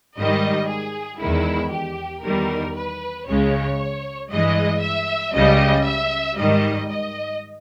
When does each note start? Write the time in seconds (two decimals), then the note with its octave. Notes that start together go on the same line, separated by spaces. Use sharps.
0.17 G#2 D#3 G3 D#5
0.68 G#4
1.20 E2 D#3 G#3 E4
1.72 G4
2.24 E2 D#3 G3 A#4
2.75 B4
3.27 C#2 C#3 G#3 C#5
4.30 G2 E3 G#3 D#5
4.82 E5
5.34 C#2 C#3 G3 D#5
5.86 E5
6.37 G#2 D#3 G3 D#5
6.89 D#5